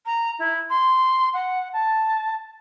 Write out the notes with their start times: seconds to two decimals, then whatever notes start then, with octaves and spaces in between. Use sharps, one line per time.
0.05 A#5
0.39 E4
0.69 C6
1.33 F#5
1.73 A5